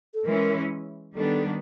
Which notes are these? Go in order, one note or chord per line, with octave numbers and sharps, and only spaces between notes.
A4
E3 G#3 C#4 E4 A#4
D#3 G3 B3 D4 A4